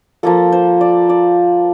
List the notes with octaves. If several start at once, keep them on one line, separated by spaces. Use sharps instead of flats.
F3 A#3 F4 A4
C5
D5
D5